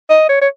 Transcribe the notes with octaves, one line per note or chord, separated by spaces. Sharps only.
D#5
C#5
C#5